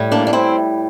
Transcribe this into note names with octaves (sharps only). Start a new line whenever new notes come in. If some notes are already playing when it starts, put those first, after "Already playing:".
Already playing: A2 G3
A#3 D4
D4
C4 E4